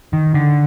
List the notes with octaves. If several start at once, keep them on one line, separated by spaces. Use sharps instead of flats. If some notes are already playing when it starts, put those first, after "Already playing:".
D#3
D3